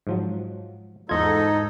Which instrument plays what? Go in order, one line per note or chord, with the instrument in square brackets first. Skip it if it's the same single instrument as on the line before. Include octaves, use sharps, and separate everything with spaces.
[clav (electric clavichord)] G#2 F3 F#3
[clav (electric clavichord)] E2 F4 [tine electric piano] G#2 D#5 G#6 [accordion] D#4 A4